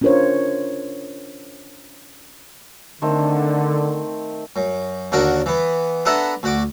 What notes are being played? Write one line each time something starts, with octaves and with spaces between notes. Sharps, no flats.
C#4 D4 F4 A#4 C5 C#5
D3 D#3 A3 C4
F#2
D#2 D3 D4 F#4 A#4
E3 B3
B3 D4 A4 E5 F#5 A#5
D2 F#4 D6